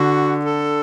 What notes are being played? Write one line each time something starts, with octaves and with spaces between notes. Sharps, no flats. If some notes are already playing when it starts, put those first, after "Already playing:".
Already playing: D3 F#4
A4